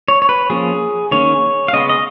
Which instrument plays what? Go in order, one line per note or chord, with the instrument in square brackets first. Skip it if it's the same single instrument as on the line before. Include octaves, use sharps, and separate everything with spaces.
[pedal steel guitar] C#5
C#5
B4
F3 A#3 C#4 G#4
D#3 A#3 C#4 C#5
F5
C#3 G#3 B3 D#5
D#5